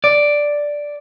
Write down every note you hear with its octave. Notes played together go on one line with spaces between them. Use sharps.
D5